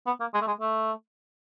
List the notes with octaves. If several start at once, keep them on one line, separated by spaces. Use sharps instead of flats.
B3
A#3
G#3
A3
G#3
A3